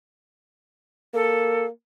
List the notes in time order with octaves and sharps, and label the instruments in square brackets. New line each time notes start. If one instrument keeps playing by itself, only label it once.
[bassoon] A#3 [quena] A4